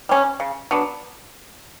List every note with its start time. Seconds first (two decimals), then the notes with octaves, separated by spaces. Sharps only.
0.09 G3 C#4
0.40 C#3
0.71 F#3 B3 D4